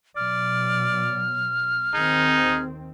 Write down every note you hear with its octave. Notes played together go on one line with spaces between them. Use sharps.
B2 F#3 D5 F6
D#2 D#3 C4 D#4 G#4